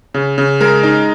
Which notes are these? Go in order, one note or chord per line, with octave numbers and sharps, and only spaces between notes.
C#3
C#3
G#3 A#4
D#4